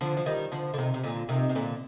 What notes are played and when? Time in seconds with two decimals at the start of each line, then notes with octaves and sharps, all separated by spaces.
0.01 D3 F3
0.17 F3
0.26 D#3 G3
0.52 D3 F3
0.74 D3
0.78 C3 D#3
0.94 C3
1.03 A#2 D3
1.29 C3 D#3
1.49 C3
1.55 A#2 D3